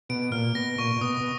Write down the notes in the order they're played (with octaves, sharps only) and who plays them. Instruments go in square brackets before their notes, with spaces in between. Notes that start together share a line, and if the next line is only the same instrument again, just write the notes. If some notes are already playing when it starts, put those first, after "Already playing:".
[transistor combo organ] B2 [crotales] D7
[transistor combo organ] A#2 [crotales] F6
[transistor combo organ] B2 [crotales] A#6
[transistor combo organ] A#2 [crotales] C#6
[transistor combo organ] A#2
[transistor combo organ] B2 [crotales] D#6
[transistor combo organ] B2